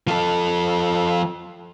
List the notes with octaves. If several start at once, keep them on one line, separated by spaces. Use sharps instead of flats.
F3 A4